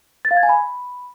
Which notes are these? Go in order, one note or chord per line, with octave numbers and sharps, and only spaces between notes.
A6
F5
G#6
G#5
B5